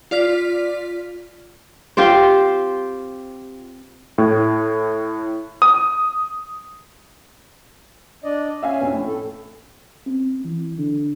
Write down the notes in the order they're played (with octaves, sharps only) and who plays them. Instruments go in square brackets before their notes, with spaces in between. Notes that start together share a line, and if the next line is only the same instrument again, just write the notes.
[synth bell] F4 D5 F6 B6
[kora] C4 F4 G4 C5
[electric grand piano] A2
D#6
[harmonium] D4 D5 D#5
[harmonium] C#4 [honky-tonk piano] E5 F5 G#5
[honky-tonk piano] A#1 F2 B2
A2
[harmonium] A4
[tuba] C4
E3
D3